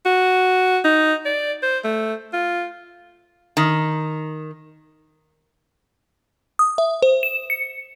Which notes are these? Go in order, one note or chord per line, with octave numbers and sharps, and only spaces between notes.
F#4
D#4
D5
C5
A3
F4
D#3
D#6
E5
C5
E7
C#7